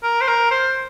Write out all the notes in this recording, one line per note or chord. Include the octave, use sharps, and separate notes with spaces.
A#4
C5
A#4
C5